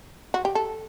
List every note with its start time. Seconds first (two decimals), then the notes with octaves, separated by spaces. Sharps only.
0.34 F#4
0.45 G4
0.55 A4